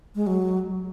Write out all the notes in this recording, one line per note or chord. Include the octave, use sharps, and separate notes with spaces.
G#3
F#3